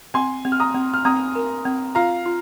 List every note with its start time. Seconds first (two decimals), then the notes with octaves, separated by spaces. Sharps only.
0.14 C4 G#5 C6
0.45 C4
0.52 F6
0.60 A#5 D#6
0.74 C4
0.94 F6
1.05 C4 A#5 D#6
1.35 A#4
1.65 C4
1.95 F4 F5 A#5
2.26 F4